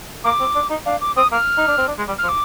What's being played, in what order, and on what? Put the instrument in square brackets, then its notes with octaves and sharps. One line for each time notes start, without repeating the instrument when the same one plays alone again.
[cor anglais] A#3 [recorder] D6
[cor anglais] C4
D4
D#4
[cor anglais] D4 [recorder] F5
[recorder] D6
[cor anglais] C4 [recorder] D#6
[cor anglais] A#3 [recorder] F6
[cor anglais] D#4
D4
C4
D4
G#3
G3
[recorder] F6
[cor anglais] F3
[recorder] D6